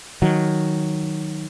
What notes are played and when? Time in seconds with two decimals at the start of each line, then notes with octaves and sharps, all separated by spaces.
0.22 D#3 F#3